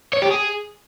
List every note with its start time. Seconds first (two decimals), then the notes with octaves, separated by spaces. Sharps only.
0.13 C#5
0.22 G4
0.31 G#4